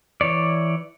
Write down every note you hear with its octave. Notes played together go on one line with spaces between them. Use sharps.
E3 C#5 D5